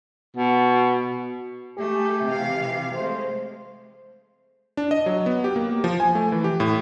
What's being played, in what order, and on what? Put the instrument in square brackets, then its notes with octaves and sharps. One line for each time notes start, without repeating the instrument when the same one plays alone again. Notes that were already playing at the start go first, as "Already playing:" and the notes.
[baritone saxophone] B2
[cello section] A3 G#4 [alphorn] G4
[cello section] C3 E3 F5
[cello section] G#3 A3 [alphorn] C5
[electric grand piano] D4
D#5
F#3
B3
G4
A#3
F3
G#5
A3
E3
G4
A2